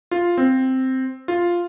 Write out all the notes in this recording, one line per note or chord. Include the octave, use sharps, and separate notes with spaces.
F4
C4
F4